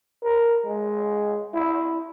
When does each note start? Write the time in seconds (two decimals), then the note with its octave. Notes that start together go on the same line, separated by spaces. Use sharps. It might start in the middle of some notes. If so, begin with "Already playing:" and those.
0.24 A#4
0.65 G#3
1.54 E4